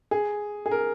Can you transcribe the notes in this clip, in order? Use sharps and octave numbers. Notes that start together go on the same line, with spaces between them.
G#4
G#4
A#4